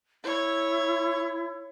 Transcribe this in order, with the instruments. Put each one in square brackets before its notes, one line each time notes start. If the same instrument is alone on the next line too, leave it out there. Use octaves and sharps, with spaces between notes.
[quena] E4 [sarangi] C#5